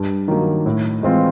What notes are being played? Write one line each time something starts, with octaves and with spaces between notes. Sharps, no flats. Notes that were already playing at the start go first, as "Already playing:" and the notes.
Already playing: G2
D#3 F#3 A#3
A2
E3 G#3 C4 F4